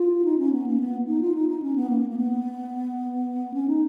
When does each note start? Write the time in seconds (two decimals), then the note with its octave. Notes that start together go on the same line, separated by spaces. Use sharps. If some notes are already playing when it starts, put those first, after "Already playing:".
Already playing: F4
0.25 D#4
0.38 C#4
0.52 B3
0.66 A#3
0.80 B3
1.07 D#4
1.21 F4
1.34 D#4
1.49 D#4
1.62 C#4
1.76 B3
1.90 A#3
2.10 A#3
2.17 B3
3.54 C#4
3.68 D#4